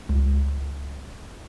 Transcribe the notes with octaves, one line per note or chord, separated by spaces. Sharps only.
C#2